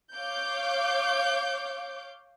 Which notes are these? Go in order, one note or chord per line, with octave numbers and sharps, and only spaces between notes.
C#5 F5 D6 G6